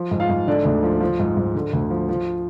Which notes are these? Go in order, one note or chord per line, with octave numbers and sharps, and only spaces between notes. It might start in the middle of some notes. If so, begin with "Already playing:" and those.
Already playing: F3
G#2
F4 F5
G#2
D3 D4 D5
D2
F3
F3
G#2
G#2
D3
D2
F3
F3